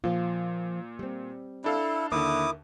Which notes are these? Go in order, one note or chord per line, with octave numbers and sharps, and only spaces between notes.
A#2 F3 F4
G3 C4
D4 E4 A4 F5
D#2 D3 E4 A#4 E5 D6 D#6